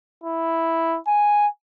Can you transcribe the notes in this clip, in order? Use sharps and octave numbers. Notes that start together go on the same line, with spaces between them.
E4
G#5